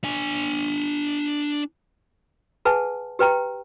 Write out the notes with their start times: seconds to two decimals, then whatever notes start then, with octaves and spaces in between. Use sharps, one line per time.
0.04 D4 G#5
2.65 G#4 B4 F#5 G#5 A5
3.19 G4 B4 G5 A#5